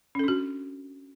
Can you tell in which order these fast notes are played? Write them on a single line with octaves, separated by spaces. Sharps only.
C#4 A4 D4 F#4